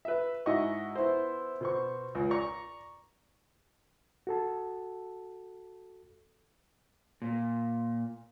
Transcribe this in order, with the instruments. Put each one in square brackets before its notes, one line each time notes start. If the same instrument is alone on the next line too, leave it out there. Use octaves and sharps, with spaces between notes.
[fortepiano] B4 E5
G#2 E4 F#4 D#5 C#6
B3 E4 C5
B2 C5 C#6
C#2
D5 A#5 C#6
[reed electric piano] F#4 A4 A5
[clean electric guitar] A#2